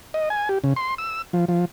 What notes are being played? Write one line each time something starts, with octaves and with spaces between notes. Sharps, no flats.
D#5
G#5
G4
C#3
C6
E6
F3
F3